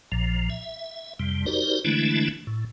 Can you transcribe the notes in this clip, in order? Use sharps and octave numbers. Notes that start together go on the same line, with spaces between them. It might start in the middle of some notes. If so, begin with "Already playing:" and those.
A#1 A#2 F3
E5
F2 C3 G3
D#4 F#4 G4 A#4 C5 D5
D3 E3 G#3 A3 D4 E4
A2